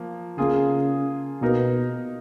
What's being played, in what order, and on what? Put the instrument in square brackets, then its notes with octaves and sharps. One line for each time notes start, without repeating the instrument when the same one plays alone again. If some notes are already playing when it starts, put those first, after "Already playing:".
Already playing: [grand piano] F3 A#3
[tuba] C#3 [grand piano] A#3 F4 G#4
[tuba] B2 [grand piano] A#3 D#4 A#4